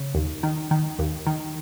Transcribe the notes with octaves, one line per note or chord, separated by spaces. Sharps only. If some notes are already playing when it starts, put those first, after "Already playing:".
Already playing: C#3
D#2
D#3
D#3
D#2
D#3